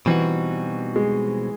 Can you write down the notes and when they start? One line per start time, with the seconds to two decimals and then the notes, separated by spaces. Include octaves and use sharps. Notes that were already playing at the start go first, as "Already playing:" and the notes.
0.06 B2 E3 G3 C4 D#4 F#4
0.96 G#3